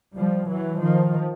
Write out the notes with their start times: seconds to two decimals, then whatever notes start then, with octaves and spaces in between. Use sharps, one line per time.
0.15 F3 G3
0.48 E3 F#3
0.81 D#3 F3